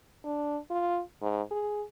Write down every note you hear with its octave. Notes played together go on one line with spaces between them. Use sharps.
D4
F4
G#2
G#4